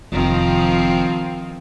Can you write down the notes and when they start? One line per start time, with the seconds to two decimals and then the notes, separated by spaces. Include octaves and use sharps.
0.12 F1 D#3 F3 C4